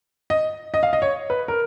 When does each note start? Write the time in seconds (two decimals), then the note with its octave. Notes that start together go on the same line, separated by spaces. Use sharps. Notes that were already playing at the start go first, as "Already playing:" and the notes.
0.30 D#5
0.74 D#5
0.83 F5
0.93 D#5
1.02 C#5
1.30 B4
1.48 A#4